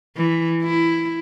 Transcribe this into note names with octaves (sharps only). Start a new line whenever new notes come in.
E3
E4